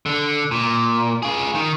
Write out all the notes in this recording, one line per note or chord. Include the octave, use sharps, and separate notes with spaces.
D3
A#2
F4 G#4
D#3